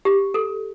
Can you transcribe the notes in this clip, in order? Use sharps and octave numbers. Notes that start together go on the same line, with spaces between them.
G4
A4